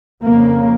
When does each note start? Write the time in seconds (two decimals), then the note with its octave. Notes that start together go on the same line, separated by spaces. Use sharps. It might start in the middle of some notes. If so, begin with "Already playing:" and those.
0.23 F2 C#3 A#3